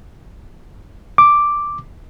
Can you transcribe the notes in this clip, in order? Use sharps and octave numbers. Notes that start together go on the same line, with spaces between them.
D6